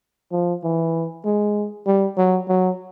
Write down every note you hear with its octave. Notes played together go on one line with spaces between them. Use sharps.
F3
E3
G#3
G3
F#3
F#3